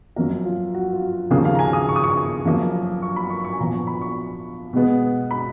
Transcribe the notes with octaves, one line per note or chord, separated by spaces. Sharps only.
F#2 F3 A#3 A#4
F4
F#4
F4
D#2 C#3 F3 A#3 G#4
F5
A#5
G#5
D#6
C#6
D#6
C#6
F#2 F3 A#3
C#6
B5
C#6
C#6
G#5
A#2 F3 B3 A#5
C#6
B5
C#6
B2 G#3 B3
B5